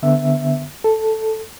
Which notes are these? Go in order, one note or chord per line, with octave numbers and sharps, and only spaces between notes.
D3 B3 E5
A4